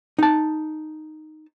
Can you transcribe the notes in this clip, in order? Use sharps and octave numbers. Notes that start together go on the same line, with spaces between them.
D#4 A5